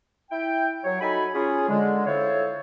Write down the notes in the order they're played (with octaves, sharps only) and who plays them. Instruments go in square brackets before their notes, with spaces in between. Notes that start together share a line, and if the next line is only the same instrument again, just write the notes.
[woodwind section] E4 G5
F#3 C#5
D#4 F#4 A4 G#5 B5
C#4 F4 G#4
D3 G#3
E4 F4 A4 C5 C#5